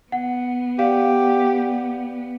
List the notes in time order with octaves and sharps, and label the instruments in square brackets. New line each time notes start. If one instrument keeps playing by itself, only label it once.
[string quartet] B3 [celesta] F#5
[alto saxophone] G4 [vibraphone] D5 F#5 [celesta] F5